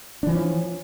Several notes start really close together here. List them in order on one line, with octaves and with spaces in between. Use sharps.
D4 E3 F3 C#4